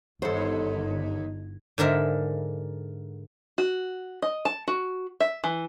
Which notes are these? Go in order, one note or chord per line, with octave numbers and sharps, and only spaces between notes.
G1 D#2 D#4 A4 C5
G#2 D3 A#4 E5
F#4
D#5
A5
F#4
E5
E3